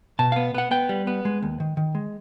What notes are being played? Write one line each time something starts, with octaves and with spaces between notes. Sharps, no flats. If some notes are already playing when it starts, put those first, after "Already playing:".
B2 A5
B3 F5
B3 F#5
B3 G5
G3
B3
G#3
D#2
D#3
D#3
G#3